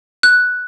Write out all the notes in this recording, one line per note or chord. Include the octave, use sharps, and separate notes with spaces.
F#6